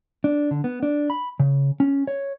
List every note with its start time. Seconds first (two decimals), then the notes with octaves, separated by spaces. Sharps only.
0.24 D4
0.51 D3
0.64 B3
0.83 D4
1.10 B5
1.40 C#3
1.80 C#4
2.07 C#5